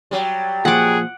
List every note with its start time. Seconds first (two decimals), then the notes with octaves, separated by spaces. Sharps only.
0.11 F#3 G3
0.65 A#2 F3 G#4 F#5 D6